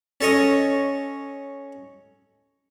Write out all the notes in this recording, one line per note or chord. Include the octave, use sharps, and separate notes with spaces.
C#4 A4 C#5 D#5